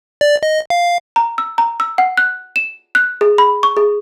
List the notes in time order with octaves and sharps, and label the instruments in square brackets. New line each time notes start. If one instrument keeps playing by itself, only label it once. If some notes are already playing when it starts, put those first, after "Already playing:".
[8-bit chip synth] D5
D#5
F5
[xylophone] A#5
E6
A#5
E6
F#5
F#6
E7
F#6
G#4
B5
C#6
G#4